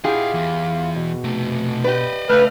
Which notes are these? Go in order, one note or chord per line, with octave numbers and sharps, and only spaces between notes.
E4 F4 G4 G#4 D#5 F#5
E2
B2
C3 A3
G4 B4 D5 D#5
C#3 A3 B4 F6